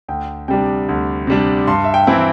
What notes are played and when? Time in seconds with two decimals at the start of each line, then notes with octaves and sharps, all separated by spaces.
0.08 D2 G5
0.48 C3 G3 D4 G5
0.89 D2
1.27 C3 G3 D4
1.67 G2 C6
1.84 E5
1.94 G5
2.07 E3 C4 E4